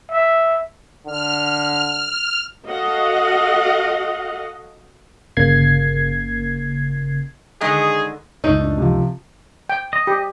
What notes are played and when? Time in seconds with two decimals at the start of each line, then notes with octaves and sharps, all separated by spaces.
0.11 E5
1.07 D3 F6
2.67 F#4 A4 D#5 F5 F#5
5.37 G1 C#3 A#3 G#6 C7
7.61 D3 D#3 G#3 G#4
8.44 C#2 F#2 A#2 A3 D#4
8.60 D4
8.78 C3 F3
9.69 G5
9.93 D#5
10.07 G4